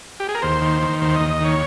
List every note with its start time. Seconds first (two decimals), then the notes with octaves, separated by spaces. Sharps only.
0.20 G4
0.28 G#4
0.35 A#4
0.42 D#2 C5
0.62 D#3
0.82 D#3
1.02 D#2 C5
1.16 D#2 D#5
1.30 D#5
1.41 D#3 C#5